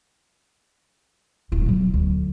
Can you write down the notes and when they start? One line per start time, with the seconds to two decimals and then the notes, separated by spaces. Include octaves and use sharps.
1.52 D1 E4
1.66 B2 F#3
1.94 D2